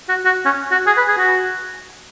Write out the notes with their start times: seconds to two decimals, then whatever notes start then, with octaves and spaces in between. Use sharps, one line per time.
0.09 F#4
0.25 F#4
0.45 C#4
0.71 F#4
0.87 G#4
0.97 B4
1.08 G#4
1.18 F#4